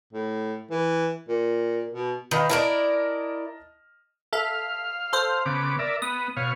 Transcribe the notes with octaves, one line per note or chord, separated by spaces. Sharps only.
A2
E3
A#2
B2
D#3 B4 D#5 F5
E4 A#4 D5 D#5 A5 F6
A4 E5 F5
A4 C5
C#3 B3 D6
A#4 D5 E5
B3 D#6
B2 C#5 F5